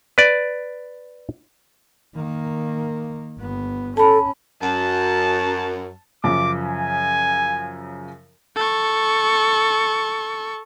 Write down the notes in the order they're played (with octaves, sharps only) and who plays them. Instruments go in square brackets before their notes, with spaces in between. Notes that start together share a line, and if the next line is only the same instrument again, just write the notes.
[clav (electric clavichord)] B4 D5
[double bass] D#3 A#3
G1 B3
[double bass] C#4 [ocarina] A4 [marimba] A5 B5
[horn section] F#2 [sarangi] A5
[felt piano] F#2 C#3 F3 [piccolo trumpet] D6
[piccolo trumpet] G#5
[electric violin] A4 C#6